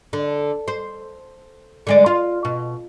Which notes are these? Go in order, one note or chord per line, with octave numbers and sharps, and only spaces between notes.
D3
C5
D3 G#3 D5
F4
B2